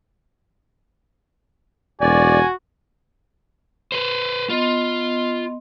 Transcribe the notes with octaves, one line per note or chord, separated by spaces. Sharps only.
E1 F#4 D5 G#5
B4 C5
B3 F4 D#5 C6